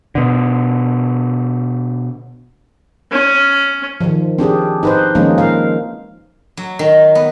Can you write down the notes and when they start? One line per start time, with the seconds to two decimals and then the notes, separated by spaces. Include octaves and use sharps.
0.15 B2 D3
3.11 C#4
4.01 D#3 F3
4.38 C4 D4 G4 G#4
4.83 D#4 B4 C5
5.15 D#3 F3 G#3 A#3 C#4 D#4
5.38 A#4 F5
6.57 F#3
6.79 D#3
7.15 B3